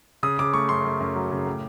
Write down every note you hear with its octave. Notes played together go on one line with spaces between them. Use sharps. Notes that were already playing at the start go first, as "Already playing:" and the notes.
C#3 D#6
C#3 D6
A3 C#6
F#2 C6
F#2
F#2
F#3
C#3
A2